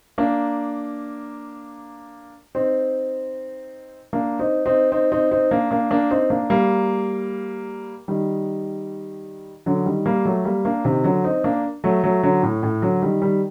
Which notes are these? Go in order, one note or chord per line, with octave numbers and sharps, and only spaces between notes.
A#3 D4
C4 D#4
A#3 D4
C4 D#4
C4 D#4
C4 D#4
C4 D#4
C4 D#4
A#3 D4
A#3 D4
A#3 D4
C4 D#4
A#3 D4
G3 A#3
D#3 G3
D3 F#3
D#3 G3
G3 A#3
F#3 A3
G3 A#3
A#3 D4
C3 D#3
D3 F#3
C4 D#4
A#3 D4
F#3 A3
F#3 A3
D3 F#3
A2
A2
D3 F#3
D#3 G3
D#3 G3